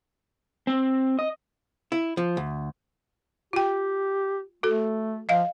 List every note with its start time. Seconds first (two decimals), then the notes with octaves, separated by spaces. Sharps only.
0.67 C4
1.19 D#5
1.92 E4
2.17 F3
2.37 D2
3.53 F4 G4 G5
4.63 A3 F#4 A4
5.29 F3 D#5 F5